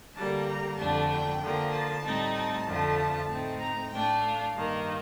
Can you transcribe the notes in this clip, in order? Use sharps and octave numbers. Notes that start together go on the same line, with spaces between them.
D3 G3 A#3 A5
A#5
F2 D3 A3 D4 A5
G5
D3 F3 A#3
A5
A2 G3 C4 D#4
A5
F2 D3 F3 A3
A2 A3 C4 D#4
A#5
A2 A3 D4 G5
F5
G2 D#3 A#3